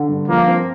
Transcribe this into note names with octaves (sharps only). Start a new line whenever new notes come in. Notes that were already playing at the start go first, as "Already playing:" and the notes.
Already playing: D3
G2
F3 A#3
C4